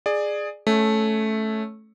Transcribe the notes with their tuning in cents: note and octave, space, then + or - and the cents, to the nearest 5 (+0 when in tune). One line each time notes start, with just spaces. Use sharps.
G#4 +0 D5 +20
A3 -10 C#4 +0 C#5 +0